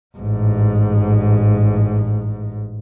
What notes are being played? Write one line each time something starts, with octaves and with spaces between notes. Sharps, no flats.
A1 G#2